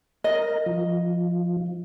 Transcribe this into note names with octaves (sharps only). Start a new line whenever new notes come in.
A#4 D#5
F3